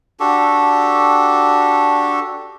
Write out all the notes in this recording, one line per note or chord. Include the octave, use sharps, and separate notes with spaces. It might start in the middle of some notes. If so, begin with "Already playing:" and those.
D4 F#4 G4 A4